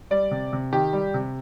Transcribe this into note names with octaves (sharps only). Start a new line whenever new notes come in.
G3 D5
C3
C3
D#3 G4
G3
C3